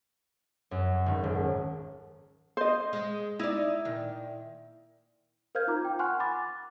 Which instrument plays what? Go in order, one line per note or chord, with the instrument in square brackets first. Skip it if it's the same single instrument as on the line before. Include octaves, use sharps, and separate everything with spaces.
[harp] F#2
G#1
D#1
[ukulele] C5 D#5
[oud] G#3
[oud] D#4 D5 [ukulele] E4
[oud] A#2 D#3
[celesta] A#4 C5 F5 F6 G6 G#6
D#4 F4 A#5 D6
G5
F#5 G#5 C6 C#6 F6 F#6
B5 C6 D6 A6